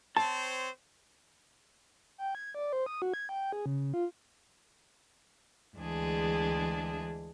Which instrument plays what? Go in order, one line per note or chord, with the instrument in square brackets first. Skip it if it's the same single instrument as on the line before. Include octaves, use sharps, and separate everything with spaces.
[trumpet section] C4 C5 C#5 [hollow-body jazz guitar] A5
[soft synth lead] G5
G#6
D5
C5
D#6
F#4
G#6
G5
G#4
C#3
F4
[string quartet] D2 E3 G#3 D4 G#4